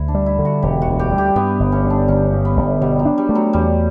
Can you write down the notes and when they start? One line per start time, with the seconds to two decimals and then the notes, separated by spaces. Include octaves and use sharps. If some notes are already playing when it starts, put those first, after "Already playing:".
Already playing: D2 E4
0.08 D4
0.15 G3
0.26 E4
0.39 D3
0.45 F#4
0.63 E1 G4
0.82 F#4
0.87 D2
0.99 G4
1.12 G3
1.18 G4
1.36 G2 B3
1.60 G1
1.72 C#4
1.84 D3
1.90 D4
2.08 G1 C#4
2.33 G2
2.45 B3
2.57 G1
2.81 B2 G3
2.99 F#3
3.06 D4
3.18 G3
3.29 A3
3.35 F#3
3.53 E2 G3